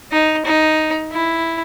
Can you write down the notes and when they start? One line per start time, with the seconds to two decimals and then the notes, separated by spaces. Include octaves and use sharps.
0.12 D#4
0.45 D#4
1.12 E4